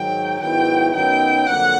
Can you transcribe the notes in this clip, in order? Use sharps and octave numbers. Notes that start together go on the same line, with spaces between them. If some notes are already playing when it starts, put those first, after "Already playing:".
Already playing: G#2 D#3 F#3 G5
G#2 D#3 F#3 B3 E4 G5
F#2 D#3 F#3 B3 D#4 G5
F2 D3 F#3 A#3 F#5